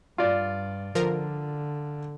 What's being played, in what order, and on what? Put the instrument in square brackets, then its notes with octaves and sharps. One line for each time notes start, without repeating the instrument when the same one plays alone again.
[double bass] G2 [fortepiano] F4 D5
[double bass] D3 [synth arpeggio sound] F3 A#4